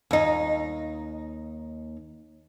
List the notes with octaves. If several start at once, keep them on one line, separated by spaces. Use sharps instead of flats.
D#2 D#4